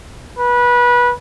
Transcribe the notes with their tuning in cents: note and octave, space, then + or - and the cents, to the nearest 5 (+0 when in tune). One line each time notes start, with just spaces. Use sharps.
B4 -20